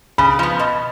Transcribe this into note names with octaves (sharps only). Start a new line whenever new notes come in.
C#3 B5
F3 B3
B2